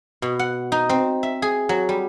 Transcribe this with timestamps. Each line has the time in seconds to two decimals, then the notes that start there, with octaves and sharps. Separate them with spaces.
0.22 B2
0.39 F#5
0.72 D#4
0.89 C4
1.23 E5
1.42 G#4
1.69 F#3
1.89 G3